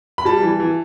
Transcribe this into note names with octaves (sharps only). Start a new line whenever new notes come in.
B5
G3 A5
E3
E3